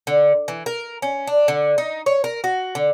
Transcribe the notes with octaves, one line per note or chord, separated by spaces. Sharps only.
D3
E3
A#4
C#4
D4
D3
D#4
C#5
A#4
F#4
D3